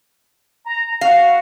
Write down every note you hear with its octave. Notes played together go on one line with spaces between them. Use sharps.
A#5
F#4 F5